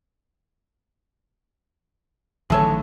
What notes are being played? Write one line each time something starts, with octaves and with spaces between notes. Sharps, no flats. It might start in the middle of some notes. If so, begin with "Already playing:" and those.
A1 D3 D#3 F#3 G#4 A4 C#5